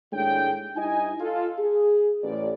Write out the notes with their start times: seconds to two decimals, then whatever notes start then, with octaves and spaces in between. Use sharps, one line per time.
0.12 D#2 A2 G#3 D4 G#4 G5
0.76 G2 D#4 E4 D#5 G#5
1.20 F4 A4
1.59 G#4
2.23 A1 D5